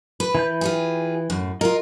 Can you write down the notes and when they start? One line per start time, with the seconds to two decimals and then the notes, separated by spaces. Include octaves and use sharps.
0.20 B4
0.35 E3 B5 G6
0.61 F4 G4 G#4
1.30 F#2 A2
1.61 F4 A#4 D#5